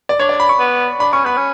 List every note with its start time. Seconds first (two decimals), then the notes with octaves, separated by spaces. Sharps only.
0.09 D5
0.20 D4 C#5
0.29 D5
0.40 B5
0.49 C#6
0.59 B3
1.00 D4 B5
1.13 C#4 C#6
1.25 B3 B5
1.37 C#4